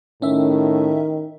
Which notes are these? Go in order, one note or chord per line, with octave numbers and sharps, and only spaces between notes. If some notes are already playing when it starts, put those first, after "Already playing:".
A2 D#3 C#4 E5